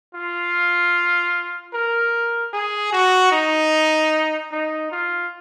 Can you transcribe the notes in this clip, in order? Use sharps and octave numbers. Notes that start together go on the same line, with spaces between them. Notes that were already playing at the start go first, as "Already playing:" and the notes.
F4
A#4
G#4
F#4
D#4
D#4
F4